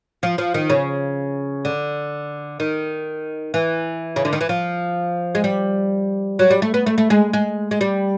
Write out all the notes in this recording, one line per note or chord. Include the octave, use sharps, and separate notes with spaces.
F3
F3
D#3
C#3
D3
D#3
E3
C#3
D3
D#3
E3
F3
G#3
G3
F#3
G3
A3
B3
A3
A3
G#3
G#3
G#3
G3